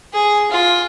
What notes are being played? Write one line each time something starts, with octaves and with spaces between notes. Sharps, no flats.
G#4
F4